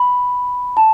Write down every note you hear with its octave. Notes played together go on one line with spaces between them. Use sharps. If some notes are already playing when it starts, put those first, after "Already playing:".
Already playing: B5
A5